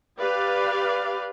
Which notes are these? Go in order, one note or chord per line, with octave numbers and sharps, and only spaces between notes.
G4 B4 D5 F5